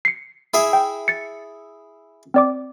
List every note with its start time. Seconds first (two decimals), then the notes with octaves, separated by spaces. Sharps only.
0.05 C7 C#7
0.54 E4 G#4 E5
0.73 G5
1.08 A6 C#7
2.34 C4 D5 D6